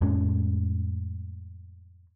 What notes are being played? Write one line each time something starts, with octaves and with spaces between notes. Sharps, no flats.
F2 A2 G#3 C#4